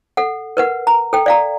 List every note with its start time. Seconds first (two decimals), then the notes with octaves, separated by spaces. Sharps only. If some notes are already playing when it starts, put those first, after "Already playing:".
0.17 A4 F#5
0.57 A#4 B4 F#5
0.87 A#5
1.13 A4 G5
1.26 D5 F5 A#5